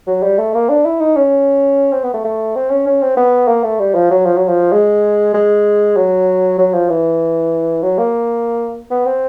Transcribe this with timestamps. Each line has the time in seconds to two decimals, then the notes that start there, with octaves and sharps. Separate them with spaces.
0.07 F#3
0.23 G3
0.38 A3
0.54 A#3
0.69 D4
0.85 E4
1.00 D#4
1.16 C#4
1.93 C4
2.03 B3
2.14 A3
2.24 A3
2.56 C4
2.70 C#4
2.87 C#4
3.02 C4
3.17 B3
3.48 A#3
3.64 A3
3.80 G3
3.95 F3
4.11 F#3
4.26 F3
4.37 F#3
4.48 F3
4.73 G#3
5.34 G#3
5.97 F#3
6.58 F#3
6.74 F3
6.90 E3
7.83 F#3
7.98 A#3
8.91 B3
9.06 C4